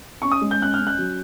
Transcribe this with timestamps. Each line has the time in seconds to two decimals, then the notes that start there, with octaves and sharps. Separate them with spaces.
0.22 C#4 C#6
0.32 D#6
0.42 G#3
0.51 G6
0.61 C#4 F#6
0.74 C#4 F6
0.87 F#6
0.98 F#3